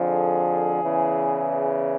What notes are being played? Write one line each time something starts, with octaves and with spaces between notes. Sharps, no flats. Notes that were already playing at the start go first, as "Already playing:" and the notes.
Already playing: F2 D3 F3 G#4
E2 C#3 E3